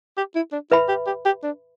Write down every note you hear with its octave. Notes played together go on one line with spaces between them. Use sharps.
G4
E4
D4
E4 B4 E5 B5
G4
G4
G4
D4